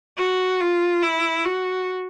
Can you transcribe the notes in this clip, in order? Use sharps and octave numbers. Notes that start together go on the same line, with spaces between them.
F#4
F4
E4
F#4